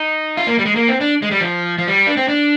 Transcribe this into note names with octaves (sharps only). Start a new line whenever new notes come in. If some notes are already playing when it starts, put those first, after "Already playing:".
Already playing: D#4
F4
A#3
G3
G#3
A#3
C4
D4
G#3
G3
F3
F3
G3
D4
C4
D4